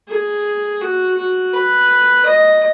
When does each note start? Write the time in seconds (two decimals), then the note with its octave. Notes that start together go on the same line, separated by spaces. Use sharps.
0.08 G#4
0.81 F#4
1.16 F#4
1.53 B4
2.26 D#5